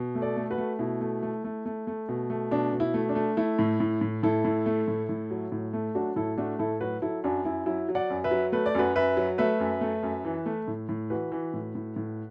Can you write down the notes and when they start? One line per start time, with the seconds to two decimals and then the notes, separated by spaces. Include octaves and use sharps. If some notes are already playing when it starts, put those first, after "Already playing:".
Already playing: B2
0.15 A3
0.22 A4 D5
0.37 A3
0.50 F#4 B4
0.58 A3
0.79 B2 E4
1.01 A3
1.23 A3
1.44 A3
1.66 A3
1.87 A3
2.09 B2
2.30 A3
2.51 B2 D4
2.72 B2
2.80 E4
2.94 A3
3.09 D4
3.15 A3
3.37 A3 E4
3.59 A2
3.80 A2
4.01 A2
4.23 A2 E4 A4
4.45 A2
4.66 A3
4.88 A2
5.09 A2
5.31 F#3
5.52 A2
5.73 A3
5.95 F#3 D4 F#4
6.16 A2 E4 A4
6.38 A3 D4 F#4
6.59 A2 E4 A4
6.81 F#3 F#4 B4
7.02 F#3 E4 A4
7.24 F#2 D4 F#4
7.45 F#2 E4
7.66 F#3 E4
7.89 F#3
7.95 D5 F#5
8.10 F#2
8.24 B4 E5
8.31 F#3
8.52 A3 B4
8.66 D5
8.75 F#2 F#4 B4
8.95 F#2 B4 E5
9.17 F#3
9.38 A3 B4 E5
9.60 F#2
9.81 A3
10.03 F#2
10.25 E3
10.46 A3
10.68 A2
10.89 A2
11.10 E3 F#4 B4
11.32 E3
11.54 A2
11.75 A2
11.96 A2